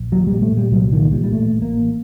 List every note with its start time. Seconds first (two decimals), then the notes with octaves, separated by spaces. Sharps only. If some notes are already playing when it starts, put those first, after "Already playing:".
Already playing: A#1
0.12 A#2 F#3
0.27 A#2 G3
0.42 A3
0.52 A#2
0.57 G3
0.72 C2 F#3
0.92 A#2 D#3
1.12 A#2 G3
1.24 G3
1.32 A1 A3
1.52 A1
1.62 A#3
1.72 A1